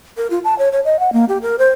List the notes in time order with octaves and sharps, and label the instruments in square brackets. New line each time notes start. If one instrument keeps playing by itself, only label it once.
[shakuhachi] A#4
F4
A5
C#5
C#5
D#5
F#5
A#3
G4
A#4
C5